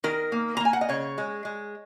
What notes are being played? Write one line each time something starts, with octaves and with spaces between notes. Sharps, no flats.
D#3 A#4
A#3
A#5
A#3 G#5
F#5
D#5
C#3 C#5
G#3
G#3